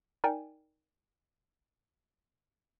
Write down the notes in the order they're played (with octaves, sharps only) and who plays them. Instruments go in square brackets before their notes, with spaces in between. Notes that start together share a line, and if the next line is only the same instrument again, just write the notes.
[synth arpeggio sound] D#4 A#4 D5 G5 G#5